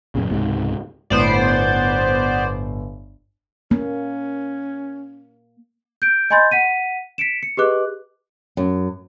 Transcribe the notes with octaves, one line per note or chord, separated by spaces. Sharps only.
F#2 A#2 C#3
C#2 G#2 C3
G1 A2 B3 C5 D5
A#3 C#4
G6 D7
D#5 G#5 B5 C6 G6 A6
F#5 B6 D#7
B6 C#7 D7 E7
C#7
G4 G#4 B4 D#5 D6 F#6
F#2